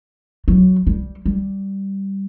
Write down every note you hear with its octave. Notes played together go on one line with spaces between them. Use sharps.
F#3
G3
G3